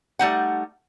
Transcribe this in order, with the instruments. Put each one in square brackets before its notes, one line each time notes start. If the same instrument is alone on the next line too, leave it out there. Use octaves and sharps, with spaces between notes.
[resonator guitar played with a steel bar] G3 A3 D#4 F#5